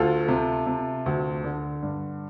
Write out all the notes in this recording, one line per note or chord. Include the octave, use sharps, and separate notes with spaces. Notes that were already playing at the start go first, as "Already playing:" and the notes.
Already playing: D2 F4 A4
C3
C3
D2
D3
G2